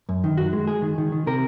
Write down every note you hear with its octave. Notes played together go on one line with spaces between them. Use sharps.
F#2
D#3
F#2 F#4
G#3
G#3 G#4
D#3
D#3
D#3
C3 A#4